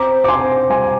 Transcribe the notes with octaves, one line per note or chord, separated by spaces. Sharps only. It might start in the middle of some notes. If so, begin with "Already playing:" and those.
Already playing: C4 A#5 D6
D6
C4 G#5 C6
G3 G#5 C6